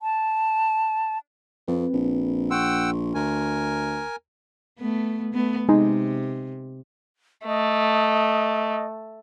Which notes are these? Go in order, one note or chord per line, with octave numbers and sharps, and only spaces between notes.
A5
F2 C4 B4
A#1
F#5 G5 C6 C#6 E6
D2 A#4 G#5
A3 B3
A3 B3
C3 G#3 D#4
A3 D#5